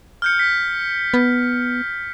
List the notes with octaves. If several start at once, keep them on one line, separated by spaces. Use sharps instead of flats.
F6 G6 C#7
B6
B3